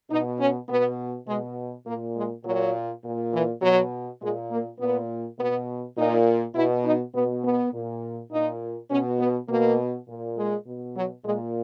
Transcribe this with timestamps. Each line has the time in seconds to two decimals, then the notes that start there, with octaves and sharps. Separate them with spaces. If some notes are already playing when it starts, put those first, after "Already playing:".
0.11 B2 D#4
0.40 C#4
0.69 B2 B3
1.28 B2 G#3
1.86 A#2 A#3
2.16 G#3
2.45 A#2 F#3
3.04 A#2
3.34 E3
3.62 B2 F#3
4.22 A#2 G#3
4.51 A#3
4.80 A#2 B3
5.39 B2 B3
5.98 A#2 D#4
6.55 B2 E4
6.85 D#4
7.15 B2 B3
7.44 B3
7.73 A#2
8.31 A#2 D#4
8.91 B2 C#4
9.19 B3
9.49 B2 A#3
10.08 A#2
10.38 G#3
10.66 B2
10.97 F#3
11.25 A#2 G#3